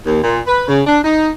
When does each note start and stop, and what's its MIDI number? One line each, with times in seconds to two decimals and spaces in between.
0.07 0.21 39
0.23 0.38 46
0.46 0.65 71
0.67 0.81 49
0.85 0.97 62
1.04 1.29 63